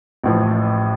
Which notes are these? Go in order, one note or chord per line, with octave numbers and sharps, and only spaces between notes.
A1 A2 F3